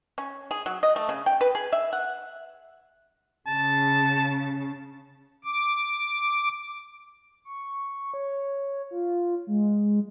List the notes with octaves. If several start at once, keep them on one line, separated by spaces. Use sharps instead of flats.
C#4
G#4
F#3
D#5
A3
C#3
G5
B4
G#4
E5
F#5
C#3 A5
D6
C#6
C#5
F4
G#3